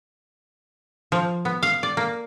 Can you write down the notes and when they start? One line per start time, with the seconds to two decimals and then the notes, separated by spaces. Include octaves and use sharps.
1.12 F3
1.45 B3
1.63 F5
1.83 D5
1.97 A#3